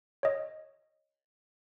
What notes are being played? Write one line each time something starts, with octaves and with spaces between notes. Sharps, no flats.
C#5 D#5